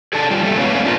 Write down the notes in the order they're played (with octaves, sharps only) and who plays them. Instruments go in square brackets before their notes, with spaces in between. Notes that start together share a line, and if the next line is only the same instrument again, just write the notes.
[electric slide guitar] G#4 A4 D5 A5
G3 F4
G3 A4 E5
G#3 A3 B3 C#4 C#5 F5
A3 A#3 C#4 D5
D4 F4 G4 A4 A#4 C5